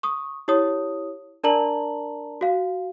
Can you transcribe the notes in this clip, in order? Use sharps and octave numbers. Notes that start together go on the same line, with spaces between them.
C#6 D#6
E4 G4 C#5 D#6
D4 A#4 D5 A5 A#5 F#7
F#4 F5